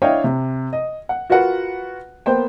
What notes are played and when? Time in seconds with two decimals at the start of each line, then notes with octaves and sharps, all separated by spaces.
0.02 D4 E4 C#5 D#5 F5 G5
0.24 C3
0.73 D#5
1.09 F#5
1.30 F4 F#4 A#4 B4 F#5
2.26 A#3 B3 C5 G5